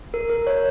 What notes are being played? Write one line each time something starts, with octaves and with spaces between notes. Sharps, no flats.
A#4
A#4
C#5